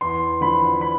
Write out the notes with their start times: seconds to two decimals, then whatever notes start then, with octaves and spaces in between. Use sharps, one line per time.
0.01 E2 C6
0.41 D3 F3 B5
0.81 B5